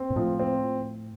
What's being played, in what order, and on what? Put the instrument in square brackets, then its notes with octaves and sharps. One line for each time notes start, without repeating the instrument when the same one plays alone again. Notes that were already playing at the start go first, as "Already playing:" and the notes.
Already playing: [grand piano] C4
[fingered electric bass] A#2
[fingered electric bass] A2 [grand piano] F3
[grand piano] C4